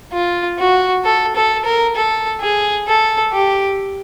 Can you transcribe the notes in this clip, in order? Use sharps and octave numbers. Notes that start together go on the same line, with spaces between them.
F4
F#4
A4
A4
A#4
A4
G#4
A4
G4